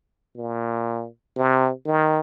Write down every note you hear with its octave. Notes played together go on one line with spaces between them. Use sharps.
A#2
C3
D#3